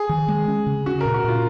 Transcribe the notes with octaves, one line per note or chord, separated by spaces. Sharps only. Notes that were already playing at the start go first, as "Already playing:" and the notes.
Already playing: G#4
D#3
G#3
C#4
C#3
C#4 F#4
A#2 A#4
F#4
A#2 F4